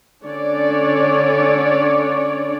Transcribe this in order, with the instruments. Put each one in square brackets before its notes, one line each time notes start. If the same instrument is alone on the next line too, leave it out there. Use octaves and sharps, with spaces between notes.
[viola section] D3 C#4 D4 C#5 D5